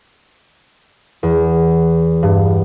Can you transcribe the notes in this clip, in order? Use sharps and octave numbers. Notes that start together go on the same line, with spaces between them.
E2
G2